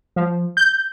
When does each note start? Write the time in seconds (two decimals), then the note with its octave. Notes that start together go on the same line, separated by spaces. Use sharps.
0.16 F3
0.57 G6